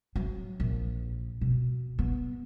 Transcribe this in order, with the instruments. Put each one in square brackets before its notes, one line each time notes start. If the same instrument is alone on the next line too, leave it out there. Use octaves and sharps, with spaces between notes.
[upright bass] F#3
A#1
B2
B3